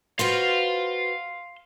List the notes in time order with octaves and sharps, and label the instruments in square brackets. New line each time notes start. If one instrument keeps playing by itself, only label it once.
[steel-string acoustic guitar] F#4 B4 C5 [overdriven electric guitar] F5 C6